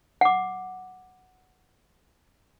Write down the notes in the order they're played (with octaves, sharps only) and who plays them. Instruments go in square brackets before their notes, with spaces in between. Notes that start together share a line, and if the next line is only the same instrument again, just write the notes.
[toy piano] F#5 D6